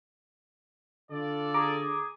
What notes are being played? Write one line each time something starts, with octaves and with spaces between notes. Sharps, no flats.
D3 F4 A4 D5
G#4 A#5 D6